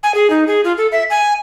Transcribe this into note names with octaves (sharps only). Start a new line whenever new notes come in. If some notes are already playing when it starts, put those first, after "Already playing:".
G#5
G#4
D#4
G#4
F4
A4
E5
G#5